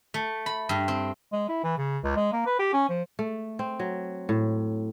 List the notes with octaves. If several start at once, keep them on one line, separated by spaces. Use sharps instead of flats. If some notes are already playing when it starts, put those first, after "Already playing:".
A3
B5
G2
C4
G#3
E4
E3
C#3
C#2
G#3
A#3
B4
G4
C#4
F3
A3
C4
F#3
A2